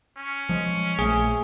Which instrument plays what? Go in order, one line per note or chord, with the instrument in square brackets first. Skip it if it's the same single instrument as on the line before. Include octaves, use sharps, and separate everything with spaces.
[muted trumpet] C#4
[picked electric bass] F3 G#3
[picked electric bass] A#1 A3 [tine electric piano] G#4